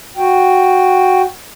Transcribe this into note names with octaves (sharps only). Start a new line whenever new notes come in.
F#4 G5